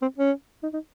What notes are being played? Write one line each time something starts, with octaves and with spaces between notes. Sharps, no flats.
C4
C#4
D#4
D#4